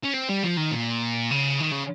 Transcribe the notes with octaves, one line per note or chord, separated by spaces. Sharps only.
C#4
C4
G3
F3
D#3
A#2
C#3
D#3
C#3